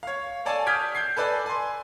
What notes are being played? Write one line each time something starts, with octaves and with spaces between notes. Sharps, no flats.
C#5 F5
A4 C#5 D5 G#5 A5
D#6 F6 G6 G#6 B6 D7
G6 G#6 C7
A4 B4 D5 G#5
G#5 C6